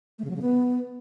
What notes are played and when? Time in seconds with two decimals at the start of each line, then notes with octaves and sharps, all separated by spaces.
0.19 A3
0.24 C#3
0.30 F#3
0.36 C#3
0.42 B3